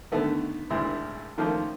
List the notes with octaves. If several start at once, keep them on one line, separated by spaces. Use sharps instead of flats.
D3 D#3 A3 B3
G#1 D2 A#2 G#3 E4
D#3 F3 A3 A#3 C#4 F4